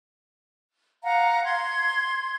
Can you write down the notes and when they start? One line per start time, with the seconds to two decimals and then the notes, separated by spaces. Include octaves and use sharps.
1.03 F5 F#5 A#5
1.45 C6 G#6